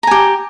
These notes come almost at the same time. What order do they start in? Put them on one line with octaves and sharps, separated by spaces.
A#5 G#5 G4